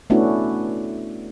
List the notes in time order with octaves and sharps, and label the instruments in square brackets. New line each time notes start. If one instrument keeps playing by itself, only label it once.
[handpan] A3 B3 C#4 D4 E4 F#4